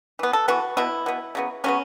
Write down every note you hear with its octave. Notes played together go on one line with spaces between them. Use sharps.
E3 B3
A4
E3 B3 F#4
B2 B3 E4
B2 B3
C#3 F#3 B3
C#3 F#3 B3 C#4